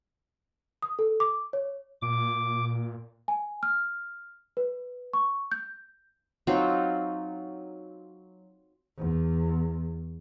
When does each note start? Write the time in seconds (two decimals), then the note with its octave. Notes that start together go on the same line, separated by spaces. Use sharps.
0.82 D#6
0.99 A4
1.20 D6
1.53 C#5
2.02 A#2 D6
3.28 G#5
3.63 F6
4.57 B4
5.14 C#6
5.52 G6
6.47 F#3 C4 D#4 F4
8.98 E2